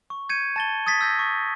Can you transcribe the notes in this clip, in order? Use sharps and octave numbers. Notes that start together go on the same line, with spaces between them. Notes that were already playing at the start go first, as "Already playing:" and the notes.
C#6
G6 G#6 C#7 D#7
A5 A6 G7
D#6 G#6 A6 B6
E6 G6 A#6
C#6